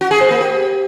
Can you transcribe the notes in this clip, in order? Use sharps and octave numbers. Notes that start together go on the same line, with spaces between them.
F#4
G#4
C5
A#3
G4